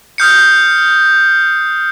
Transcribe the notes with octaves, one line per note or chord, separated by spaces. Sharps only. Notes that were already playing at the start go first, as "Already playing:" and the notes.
D#6 F6 G6 C7 C#7